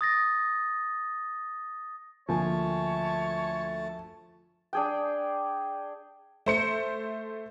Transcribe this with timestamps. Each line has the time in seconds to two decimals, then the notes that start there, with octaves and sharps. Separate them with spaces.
0.01 D#6 A6 A#6
2.29 D2 F3 A3 A#3 C#5 G#5 A5
4.73 D4 G#4 G5
6.46 A3 C5 C#7